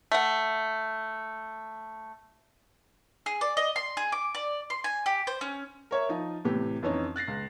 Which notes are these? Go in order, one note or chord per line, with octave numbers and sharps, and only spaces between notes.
A3 F#5
G#4
D5
D#5
C6
G#4
D6
D5
C6
G#5
G4
C5
C#4
A#4 C#5 E5
F3 D#4
A2 C3 E3 G4
F2 E3 C#4 D#4
F#6 A6 A#6 C7
C#2